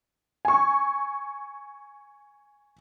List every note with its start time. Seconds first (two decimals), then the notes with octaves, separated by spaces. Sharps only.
0.45 G#5 C#6